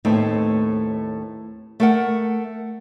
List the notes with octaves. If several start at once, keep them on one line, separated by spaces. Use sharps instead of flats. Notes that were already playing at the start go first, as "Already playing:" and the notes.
D#2 A2 A3 C4 D#4 B4
A3 A#4 F#5